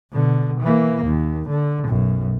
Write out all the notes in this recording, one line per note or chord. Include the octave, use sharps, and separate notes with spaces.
B2 D3
E3 A#3
D#2
D3
B1 F#2